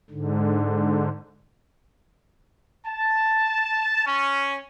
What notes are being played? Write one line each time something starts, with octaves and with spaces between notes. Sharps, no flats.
G#2 D3
A5
C#4